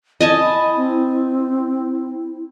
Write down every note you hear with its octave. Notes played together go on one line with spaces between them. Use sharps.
E4 D#5 G#5 A5
B5
C4